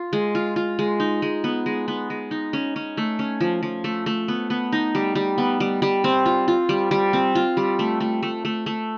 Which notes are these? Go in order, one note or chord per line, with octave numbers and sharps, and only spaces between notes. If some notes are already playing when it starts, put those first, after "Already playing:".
Already playing: F4
G#3
F4
F4
G#3
D#4
G#3
B3
G#3
B3
G#3
D#4
C#4
C#4
A3
C#4
F3
F3
A3
A3
B3
B3
D#4
G3
G3
B3
G3
G3
C4
F4
F4
G3
G3
C4
F4
G3
A3
A3
A3
A3
A3